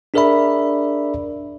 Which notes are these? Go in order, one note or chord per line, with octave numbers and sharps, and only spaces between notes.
D4 G#4 A#4 D5 E5 B5